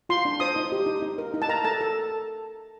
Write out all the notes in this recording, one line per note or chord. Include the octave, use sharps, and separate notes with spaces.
F4 C6
D4
C5 D#6
D#4
G4
D#4
D#4
A#4
D#4
A5
A#4 A#5
A4 A5
A4